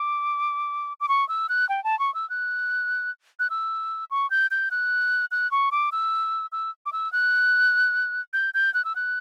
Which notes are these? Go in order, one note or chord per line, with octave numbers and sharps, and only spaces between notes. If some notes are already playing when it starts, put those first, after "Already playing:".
Already playing: D6
D6
C#6
E6
F#6
G5
A5
C#6
E6
F#6
F#6
E6
C#6
G6
G6
F#6
F#6
C#6
D6
E6
E6
D6
E6
F#6
G6
G6
F#6
E6
F#6